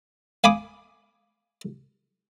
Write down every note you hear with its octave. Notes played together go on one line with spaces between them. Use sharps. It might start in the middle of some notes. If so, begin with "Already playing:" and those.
F5 G#5 B5 D6 D#6